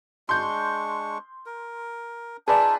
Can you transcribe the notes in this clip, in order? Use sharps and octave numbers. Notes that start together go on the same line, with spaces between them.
G#3 D4 C6 C#6 G6
A#4
D#4 F4 G#4 B4 D5 E5 A5